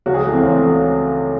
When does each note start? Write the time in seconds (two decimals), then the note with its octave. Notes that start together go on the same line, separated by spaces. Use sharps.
0.06 C#2 F#4
0.14 G#4
0.20 E3 A4
0.33 C4
0.43 C#2 A3